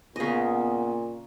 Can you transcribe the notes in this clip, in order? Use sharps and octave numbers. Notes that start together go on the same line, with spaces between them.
A#2 C#3 B3 D#5